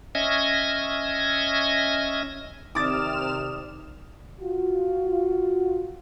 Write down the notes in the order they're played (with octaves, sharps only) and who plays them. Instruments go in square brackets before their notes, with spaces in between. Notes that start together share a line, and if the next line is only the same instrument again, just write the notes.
[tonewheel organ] C#4 D#5 E5 G#6 A#6
[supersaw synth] C3 F6 E7 [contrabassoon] D#3 [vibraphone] D5 D#6 [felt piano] D6 A6
[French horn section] F4 F#4